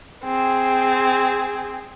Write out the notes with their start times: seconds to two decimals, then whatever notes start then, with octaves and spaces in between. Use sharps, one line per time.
0.24 C4 G#4